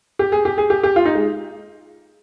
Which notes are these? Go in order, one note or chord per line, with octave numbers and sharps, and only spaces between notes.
G4
G#4
G4
G#4
G4
G4
F4
D#4
G#3